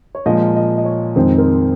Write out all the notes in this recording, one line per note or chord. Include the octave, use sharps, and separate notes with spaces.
C#5
A#2 F3 G#3 D#5
D#5
D#5
C#5
F2 D#3 G#3 C4 D#4 C5
A#4